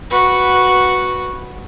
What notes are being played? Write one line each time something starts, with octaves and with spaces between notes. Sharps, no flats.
F#4 B4